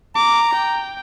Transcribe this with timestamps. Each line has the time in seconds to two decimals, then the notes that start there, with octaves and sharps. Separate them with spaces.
0.15 A#5 D6
0.54 G5